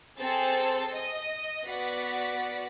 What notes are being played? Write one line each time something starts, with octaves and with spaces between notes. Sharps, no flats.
C4 G#4 A4 C5 E6 A6
D#5
B3 F#4 D5 F#5 B6